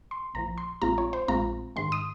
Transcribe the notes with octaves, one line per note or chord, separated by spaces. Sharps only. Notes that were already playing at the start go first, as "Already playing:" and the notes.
C6
A#1 A#2 F3 A#5
C6
A#1 A#2 G#3 C4 F4 A#5
C#5
C5
A#1 A#2 G#3 C4 F4 A#5
G#2 D#3 G#3 C6
D#6